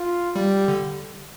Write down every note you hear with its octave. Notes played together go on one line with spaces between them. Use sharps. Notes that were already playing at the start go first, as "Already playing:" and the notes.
Already playing: F4
G3 G4
D3